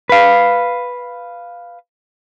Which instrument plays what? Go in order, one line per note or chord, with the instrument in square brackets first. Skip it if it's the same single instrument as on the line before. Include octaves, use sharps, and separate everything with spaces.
[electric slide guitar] B4 F5